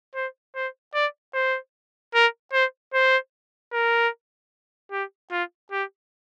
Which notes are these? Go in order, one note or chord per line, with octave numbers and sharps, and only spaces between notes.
C5
C5
D5
C5
A#4
C5
C5
A#4
G4
F4
G4